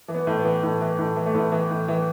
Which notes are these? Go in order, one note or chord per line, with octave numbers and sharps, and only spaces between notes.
E3
B3
A2
E3 B3
A2
E3
A2
E3
A3
A2 B3
E3
A2
E3